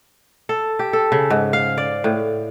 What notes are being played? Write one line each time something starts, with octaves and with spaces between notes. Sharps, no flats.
A4
G4
A4
C#3
G#2
F5
D5
A2